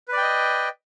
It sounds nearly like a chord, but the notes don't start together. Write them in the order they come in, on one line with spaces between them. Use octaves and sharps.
B4 D5 G5 D#5